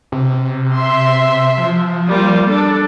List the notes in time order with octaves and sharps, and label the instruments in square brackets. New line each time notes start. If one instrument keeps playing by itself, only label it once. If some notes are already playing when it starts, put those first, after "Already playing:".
[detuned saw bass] C3
[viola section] E5 C6
[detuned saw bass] F3
[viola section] G3 A#3 F4
D4 A4